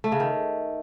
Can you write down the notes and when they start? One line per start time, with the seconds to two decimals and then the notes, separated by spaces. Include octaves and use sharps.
0.04 A3
0.12 C#3
0.20 D#3